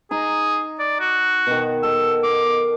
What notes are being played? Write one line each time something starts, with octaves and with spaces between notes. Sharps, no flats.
D#4 G#4 A#5
D5
F#4
B2 D#3
A4 D#5 E6
D6